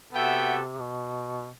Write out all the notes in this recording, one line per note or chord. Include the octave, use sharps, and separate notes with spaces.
C3 B3 F#4 A4 E5 G5
B2